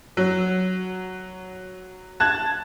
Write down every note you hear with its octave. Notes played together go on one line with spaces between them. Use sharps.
F#3
A5 F#6 G#6